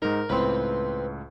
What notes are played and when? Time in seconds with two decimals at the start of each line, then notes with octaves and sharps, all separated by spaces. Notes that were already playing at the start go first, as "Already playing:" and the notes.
0.02 G#2 D#4 A#4
0.29 C#2 A2 C4 B4